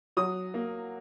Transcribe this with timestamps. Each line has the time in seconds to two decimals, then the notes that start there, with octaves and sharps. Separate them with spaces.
0.17 F#3 D#6
0.54 A#3